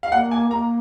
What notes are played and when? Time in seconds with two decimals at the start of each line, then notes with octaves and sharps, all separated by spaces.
0.03 F5
0.12 A#3 F#5
0.31 G#5
0.50 A#3 A#5